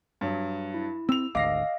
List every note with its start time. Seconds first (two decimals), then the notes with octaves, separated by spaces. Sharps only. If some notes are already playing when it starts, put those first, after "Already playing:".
0.21 G2 F#3
0.74 E4
1.09 C4 E6 F7
1.35 G#1 D2 D#5 F5 D6 A#6 C7